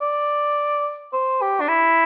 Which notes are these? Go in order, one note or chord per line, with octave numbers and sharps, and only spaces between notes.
D5
C5
G4
D4
E4